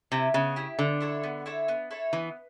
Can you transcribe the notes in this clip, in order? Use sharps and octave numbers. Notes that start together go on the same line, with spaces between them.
C3 E4 G4
C#3 B3
E4 G4
D3 B3
E4 A4 C#5
B3
E4 A4 C#5
B3
E4 A4 C#5
E3 B3